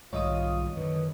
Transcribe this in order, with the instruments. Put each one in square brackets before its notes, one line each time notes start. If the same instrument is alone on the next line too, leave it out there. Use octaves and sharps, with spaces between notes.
[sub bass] B1 [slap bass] G#2 D#3 G3 [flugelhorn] F4 [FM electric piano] C#5 D#5 D#6
[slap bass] F#2 D3 [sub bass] D#3 [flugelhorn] B4